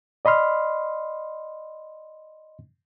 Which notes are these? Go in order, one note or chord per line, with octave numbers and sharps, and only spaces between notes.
D5 D#5 B5 C6 F6